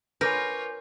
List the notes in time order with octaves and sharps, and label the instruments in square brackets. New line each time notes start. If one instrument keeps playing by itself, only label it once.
[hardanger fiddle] F4 C#5 [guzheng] A#4 [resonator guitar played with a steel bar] B4 [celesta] G#5 D6 G6